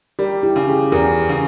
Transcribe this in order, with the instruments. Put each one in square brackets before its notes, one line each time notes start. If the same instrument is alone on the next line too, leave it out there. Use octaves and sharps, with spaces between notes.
[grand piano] G3 [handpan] G4 A#4
[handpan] E4 G4
[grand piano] C#3
[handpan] F4 G#4
[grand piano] E2 [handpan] G4 A#4
[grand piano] C#3